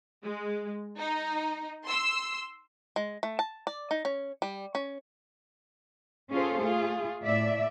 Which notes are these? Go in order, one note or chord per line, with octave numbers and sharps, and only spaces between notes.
G#3
D#4
C6 E6
G#3
A3
A5
D5
D#4
C#4
G3
C#4
C#4 F4 G#4 A4 C5
A3 F4 G#4
A2 D5 E5